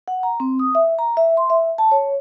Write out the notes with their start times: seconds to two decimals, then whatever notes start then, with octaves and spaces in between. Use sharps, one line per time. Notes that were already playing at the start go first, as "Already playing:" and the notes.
0.08 F#5
0.23 A#5
0.40 C4
0.59 D#6
0.75 E5
0.99 A#5
1.17 E5
1.37 C6
1.50 E5
1.78 A5
1.92 C#5